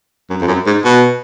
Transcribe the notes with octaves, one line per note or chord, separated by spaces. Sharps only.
F#2
F2
F#2
G#2
B2